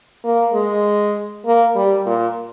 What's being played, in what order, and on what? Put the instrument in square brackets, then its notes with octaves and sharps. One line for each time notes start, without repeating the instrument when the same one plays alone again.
[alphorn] A#3
G#3
A#3
G3
A#2